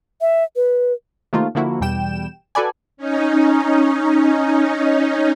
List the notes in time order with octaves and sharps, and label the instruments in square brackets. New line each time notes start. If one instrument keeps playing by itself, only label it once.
[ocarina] E5
B4
[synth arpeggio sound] C3 D#3 A3 A#3 F4
D3 F3 A#3 E4 F#4
E2 B2 G3 G5 E7
F#4 A4 B4 D5 G#5
[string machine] C#4 D#4